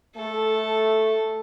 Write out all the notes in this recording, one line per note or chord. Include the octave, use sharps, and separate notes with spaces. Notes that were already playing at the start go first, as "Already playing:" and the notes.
A3 A4